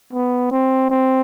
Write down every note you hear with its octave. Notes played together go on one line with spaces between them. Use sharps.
B3
C4
C4